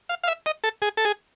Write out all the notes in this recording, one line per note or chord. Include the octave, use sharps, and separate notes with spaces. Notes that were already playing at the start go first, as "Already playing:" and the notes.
F5
F5
E5
D#5
A4
G#4
A4
G#4